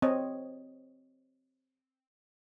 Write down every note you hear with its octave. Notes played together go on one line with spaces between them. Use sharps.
C4 C#5 D#5